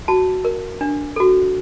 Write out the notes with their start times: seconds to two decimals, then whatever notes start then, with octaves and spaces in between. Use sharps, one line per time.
0.08 F#4 A5
0.45 A#4
0.81 D4
1.16 F#4 A4